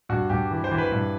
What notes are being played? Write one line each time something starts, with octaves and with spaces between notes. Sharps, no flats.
G2 F#4
G2 G4
E3
C5
E3
B4
G2